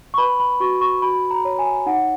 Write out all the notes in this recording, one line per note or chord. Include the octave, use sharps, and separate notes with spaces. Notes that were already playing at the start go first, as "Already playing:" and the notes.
C#6
B4 B5
B5
F#4 C#6
C#6
F#4 B5
A#5
C#5
G#5
D#4 F#5